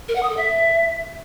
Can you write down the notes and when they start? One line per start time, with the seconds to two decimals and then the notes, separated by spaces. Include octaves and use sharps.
0.08 A#4
0.16 F#5
0.23 D#6
0.30 A4
0.37 E5